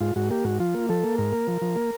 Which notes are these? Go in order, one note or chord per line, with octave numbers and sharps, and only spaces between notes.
G#2 F4
G#2 F#4
A#3 G4
G#2 F#4
F3 F4
A#3
F3 A4
A#3
G#2 A#4
A#3
F3
F3
A#3